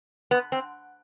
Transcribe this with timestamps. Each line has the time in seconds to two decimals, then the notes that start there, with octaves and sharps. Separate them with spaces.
0.31 B3
0.52 C4